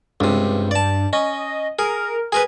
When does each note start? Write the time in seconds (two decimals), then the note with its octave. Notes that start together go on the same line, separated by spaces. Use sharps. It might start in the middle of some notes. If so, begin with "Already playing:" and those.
0.20 C#2 G2 C3
0.71 D5 A5
1.13 C#4 D#5
1.79 G#4 A#4
2.32 G#4 A#4 B4 G#5